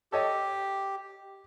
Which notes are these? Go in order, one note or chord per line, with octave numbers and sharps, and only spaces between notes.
G4 A4 C#5 D#5